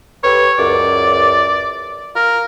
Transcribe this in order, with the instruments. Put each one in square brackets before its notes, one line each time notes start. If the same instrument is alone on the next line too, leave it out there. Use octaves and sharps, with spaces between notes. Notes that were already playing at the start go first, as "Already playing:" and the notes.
[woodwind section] G4 A4 B4 [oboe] C#5
[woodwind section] C#2 F#2 [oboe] D5
[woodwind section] F4 [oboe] A#4